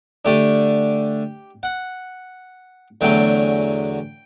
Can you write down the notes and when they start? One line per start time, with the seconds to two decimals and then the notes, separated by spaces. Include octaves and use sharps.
0.25 D3 A3 D4 G4
1.63 F#5
3.01 E2 D3 F#3 A3 G5